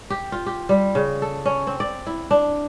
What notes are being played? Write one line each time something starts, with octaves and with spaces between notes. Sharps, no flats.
G4
F4
G4
G3
C#3
A4
C#4
C4
D5
E4
D4